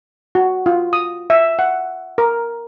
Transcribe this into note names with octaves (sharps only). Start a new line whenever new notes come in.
F#4
F4
D#6
E5
F#5
A#4